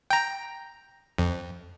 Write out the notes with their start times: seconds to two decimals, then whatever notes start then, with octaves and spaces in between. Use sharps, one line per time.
0.10 G5 A#5
1.18 F2